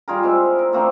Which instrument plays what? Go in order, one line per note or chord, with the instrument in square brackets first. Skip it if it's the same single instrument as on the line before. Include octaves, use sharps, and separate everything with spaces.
[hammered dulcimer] G3 F4 G#4 A#4
G#3 C4 E4
A#4
A3 A#3 C4 D4